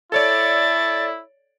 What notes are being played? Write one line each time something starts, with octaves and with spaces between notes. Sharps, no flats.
E4 A4 C#5 D5 A6